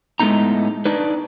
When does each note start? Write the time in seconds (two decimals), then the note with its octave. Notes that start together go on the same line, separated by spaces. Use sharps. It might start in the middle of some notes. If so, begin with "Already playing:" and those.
0.20 A2 G#3 A3 B3 D#4 A#5
0.85 D4 D#4 B4